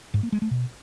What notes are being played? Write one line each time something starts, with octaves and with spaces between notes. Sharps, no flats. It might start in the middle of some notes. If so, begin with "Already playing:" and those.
G#2
A#3
G#3
A3
B2